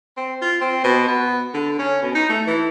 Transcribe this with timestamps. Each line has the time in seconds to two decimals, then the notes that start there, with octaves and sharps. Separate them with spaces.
0.17 C4
0.42 F4
0.61 C4
0.84 B2
1.08 B3
1.54 D3
1.79 C#4
2.02 B2
2.15 D#4
2.30 A3
2.47 E3